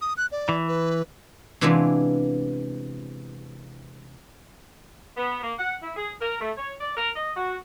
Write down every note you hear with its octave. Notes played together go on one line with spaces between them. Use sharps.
D#6
F#6
D5
E3
B4
C3 E3 G#3 B3 D4 F4
B3
A#3
F#5
E4
G#4
A#4
A3
C#5
D5
A#4
D#5
F#4